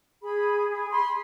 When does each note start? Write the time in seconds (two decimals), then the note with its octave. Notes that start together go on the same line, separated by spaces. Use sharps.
0.22 G#4 B5
0.69 G#4
0.91 B5 C6